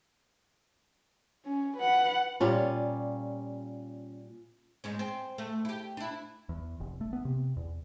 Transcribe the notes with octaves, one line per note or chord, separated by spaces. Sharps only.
C#4
B4 F#5
A#2 G3 C#4 F4
G#2 G#3 C#4
C4
A3
E4 G4
D4 E4
E2
F1
A3
B3
C3
E2